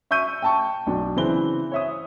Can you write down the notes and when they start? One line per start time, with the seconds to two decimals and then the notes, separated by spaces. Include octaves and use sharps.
0.11 E5 C#6 E6 G6 D#7
0.42 G5 A5 C#6
0.87 B1 D4
1.16 C#3 E3 C4 G7
1.72 C#5 E5 D#6